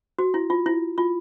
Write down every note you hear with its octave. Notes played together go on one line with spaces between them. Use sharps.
F#4
E4
F4
E4
F4